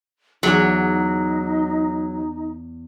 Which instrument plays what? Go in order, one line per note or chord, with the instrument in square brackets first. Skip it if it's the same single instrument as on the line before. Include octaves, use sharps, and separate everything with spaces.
[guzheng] E2 E5 [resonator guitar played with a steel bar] F#3 [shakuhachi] D#4